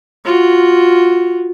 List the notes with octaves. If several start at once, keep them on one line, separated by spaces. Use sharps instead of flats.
F4 F#4